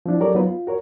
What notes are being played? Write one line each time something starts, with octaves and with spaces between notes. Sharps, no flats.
F3 C4 D4 E4
F#3 G4 A4 A#4 C#5 D5
F#3 B3 D#4 F4 B4
F4
F#4 A#4 C#5